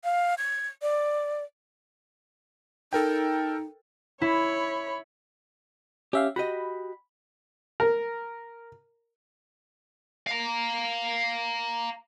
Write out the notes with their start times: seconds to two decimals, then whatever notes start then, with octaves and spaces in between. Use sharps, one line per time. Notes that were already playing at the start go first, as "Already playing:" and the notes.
0.04 F5
0.38 G#6
0.82 D5
2.93 D#4 A4 A#4 G5
4.21 E4 C#5 B5
6.13 C#4 G4 E5 F5
6.36 F#4 G4 D#5 B5
7.80 A#4
10.27 F5 A#5